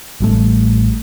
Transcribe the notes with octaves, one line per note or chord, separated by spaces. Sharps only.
A1 G3 A3